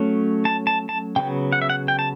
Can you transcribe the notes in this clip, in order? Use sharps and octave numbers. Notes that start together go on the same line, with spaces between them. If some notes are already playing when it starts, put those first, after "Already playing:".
Already playing: F#3 A3 C#4
A5
A5
A5
C#3 F#3 B3 G5
F#5
E5
F#5
G5
A5